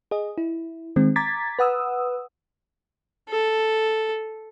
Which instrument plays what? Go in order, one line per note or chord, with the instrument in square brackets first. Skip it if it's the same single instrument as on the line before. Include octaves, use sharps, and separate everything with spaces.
[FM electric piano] G#4 D#5
E4
D#3 G#3 C4
A#5 D6 G#6 A6 B6
B4 F#5 D#6 E6
[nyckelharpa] A4